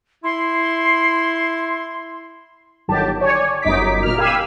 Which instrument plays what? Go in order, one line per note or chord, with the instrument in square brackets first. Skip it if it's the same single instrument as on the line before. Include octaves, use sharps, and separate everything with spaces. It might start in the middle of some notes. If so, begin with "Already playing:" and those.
[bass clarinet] E4 [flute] C6
[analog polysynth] G1 D#3 F#3 G4 A5
C#5 D5 G#5
G1 F#2 D#4 D6 B6
A#2 A#4 F6
G4 F5 G#5 B5 E6